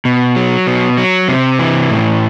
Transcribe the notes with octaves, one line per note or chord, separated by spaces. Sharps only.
B2
F#3
B2
F#3
C3
E3
A2